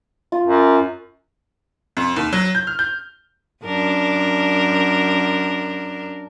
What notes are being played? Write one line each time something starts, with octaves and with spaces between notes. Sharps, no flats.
F4
F#2
F2
D#2
F#3
G6
F6
G6
F#2 D4 A#4